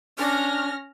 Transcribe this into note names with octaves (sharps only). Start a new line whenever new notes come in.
C#4 D4 F6 A#6